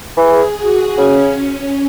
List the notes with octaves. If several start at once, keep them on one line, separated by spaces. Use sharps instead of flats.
E3 G#4
F#4
C#3 C#4
C#4